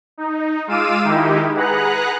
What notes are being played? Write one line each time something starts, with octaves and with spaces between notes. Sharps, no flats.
D#4
G#3 F4 F5 D6 E6 D#7
D#3 G#3 D#4 E4 G4
G#4 B4 F#5 A#5 F#6